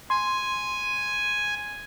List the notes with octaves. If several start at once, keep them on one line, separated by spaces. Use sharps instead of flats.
G#5 C6